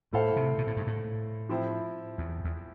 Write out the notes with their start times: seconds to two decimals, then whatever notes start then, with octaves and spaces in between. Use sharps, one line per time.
0.13 A2 A3 E4 A4 C5 F5
0.36 C3
0.58 B2
0.67 A2
0.77 G2
0.87 A2
1.49 F3 C4 E4
2.18 E2
2.44 E2